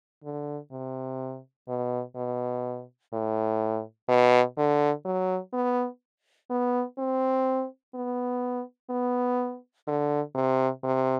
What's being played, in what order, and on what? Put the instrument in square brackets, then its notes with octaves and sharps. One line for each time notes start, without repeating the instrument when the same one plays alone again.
[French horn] D3
C3
B2
B2
A2
B2
D3
F#3
B3
B3
C4
B3
B3
D3
C3
C3